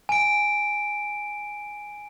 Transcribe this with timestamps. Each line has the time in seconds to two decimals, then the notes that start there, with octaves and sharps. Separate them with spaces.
0.09 G#5 D7